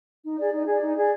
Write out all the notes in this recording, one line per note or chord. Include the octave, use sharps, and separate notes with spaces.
D#4
G#4 D5
D#4
G#4 D5
D#4
G#4 D5